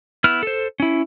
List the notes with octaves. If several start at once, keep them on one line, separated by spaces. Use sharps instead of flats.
B3 E4 E6 F6
A4 C5
C#4 E4